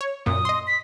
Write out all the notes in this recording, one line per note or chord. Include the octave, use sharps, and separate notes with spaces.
C#5
F#2 A#2 D#6
D#5 C6
B6